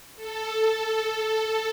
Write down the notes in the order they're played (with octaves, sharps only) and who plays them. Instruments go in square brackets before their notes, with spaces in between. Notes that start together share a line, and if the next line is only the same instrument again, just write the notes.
[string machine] A4